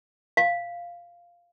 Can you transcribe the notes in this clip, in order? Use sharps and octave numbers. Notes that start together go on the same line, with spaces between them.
F5